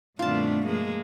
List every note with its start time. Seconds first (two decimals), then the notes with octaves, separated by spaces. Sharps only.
0.19 G2 B2 D#3 A3 C4 D4 F4 A5
0.65 F3 G#3 A#3